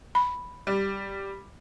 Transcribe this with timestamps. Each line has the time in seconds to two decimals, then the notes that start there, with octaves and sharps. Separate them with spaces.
0.15 B5
0.67 G3